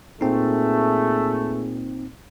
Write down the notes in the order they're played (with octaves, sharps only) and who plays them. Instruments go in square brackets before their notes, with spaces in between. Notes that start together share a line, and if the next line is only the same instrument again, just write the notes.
[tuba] A#2 [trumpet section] A3 [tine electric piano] C4 D#4 [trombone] G#4